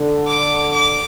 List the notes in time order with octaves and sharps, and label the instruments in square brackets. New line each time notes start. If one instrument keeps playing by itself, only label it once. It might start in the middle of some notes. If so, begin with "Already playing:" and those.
Already playing: [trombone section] D3
[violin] D6
D6